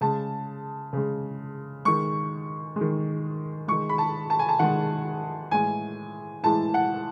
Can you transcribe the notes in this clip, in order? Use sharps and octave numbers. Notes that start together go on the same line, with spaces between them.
C#3 G#3 A5
C#3 G#3
D#3 G#3 C#6
G#3
D#3
D#3 G#3 C#6
B5
A5
A5
G#5
A5
D#3 G#3 F#5
A2 E3 G#3 G#5
A2 E3 G#3 A5
F#5